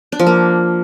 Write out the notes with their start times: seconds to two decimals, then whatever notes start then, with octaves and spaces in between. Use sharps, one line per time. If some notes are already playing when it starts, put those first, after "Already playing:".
0.12 D4
0.19 F3
0.27 A#3